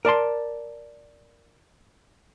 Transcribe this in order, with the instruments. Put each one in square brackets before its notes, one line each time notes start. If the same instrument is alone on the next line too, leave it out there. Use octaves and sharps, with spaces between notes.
[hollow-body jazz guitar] A#4 D5 A5 C6